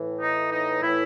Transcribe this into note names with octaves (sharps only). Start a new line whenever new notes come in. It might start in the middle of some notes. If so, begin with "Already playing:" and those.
Already playing: A2 E3
D#4
D#4
A2 E3 E4